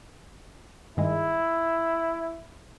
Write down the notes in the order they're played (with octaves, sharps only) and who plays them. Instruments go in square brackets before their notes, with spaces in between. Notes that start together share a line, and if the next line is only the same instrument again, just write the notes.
[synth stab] G2 D#3 G#3 [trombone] E4